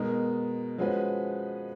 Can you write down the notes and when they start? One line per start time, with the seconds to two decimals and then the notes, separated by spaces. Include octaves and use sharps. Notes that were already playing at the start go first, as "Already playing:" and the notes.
Already playing: B2 G#3 D#4 A#4
0.78 F3 G#3 C#4 F#4 B4